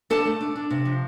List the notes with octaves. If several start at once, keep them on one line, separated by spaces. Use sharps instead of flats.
D4 A4 A5
A3
D4
D4
C3
F3